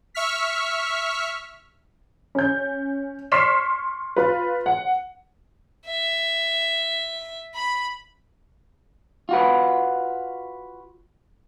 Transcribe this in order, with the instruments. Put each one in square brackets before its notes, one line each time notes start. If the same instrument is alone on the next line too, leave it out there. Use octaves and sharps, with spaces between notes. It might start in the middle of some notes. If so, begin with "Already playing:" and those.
[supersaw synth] E5 C#6 F6 B6
[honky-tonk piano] C#4 G6
C6 C#6 F6 B6 C7 E7
F4 B4
F#5
[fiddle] E5
B5
[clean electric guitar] F4 F#4 B4